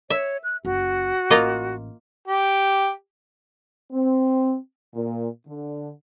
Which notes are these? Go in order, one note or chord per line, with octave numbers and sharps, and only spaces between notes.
C#5 E5
F#6
F#1 F#4
A1 A#3 F4 D#5
G4
C4
A#2
D3